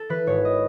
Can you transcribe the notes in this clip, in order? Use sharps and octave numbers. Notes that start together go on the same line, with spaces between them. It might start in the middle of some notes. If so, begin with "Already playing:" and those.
Already playing: A4
E3 B4
G#1 C#5
D#5